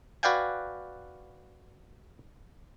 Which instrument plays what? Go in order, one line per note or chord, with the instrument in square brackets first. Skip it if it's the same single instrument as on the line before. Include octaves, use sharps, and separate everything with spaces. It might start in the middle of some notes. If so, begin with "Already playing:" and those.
[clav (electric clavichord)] F#4 B4 D5 F5 G5 G#5